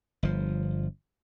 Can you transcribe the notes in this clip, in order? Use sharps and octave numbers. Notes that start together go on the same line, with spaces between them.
G1 F3